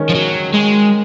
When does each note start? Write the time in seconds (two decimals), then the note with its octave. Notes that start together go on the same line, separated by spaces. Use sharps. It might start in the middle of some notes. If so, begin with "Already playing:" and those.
Already playing: D#3 G#3 C#4
0.09 F3
0.15 F#3
0.54 G#3